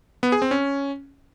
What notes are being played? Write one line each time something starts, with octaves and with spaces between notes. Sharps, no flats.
B3
G#4
C4
C#4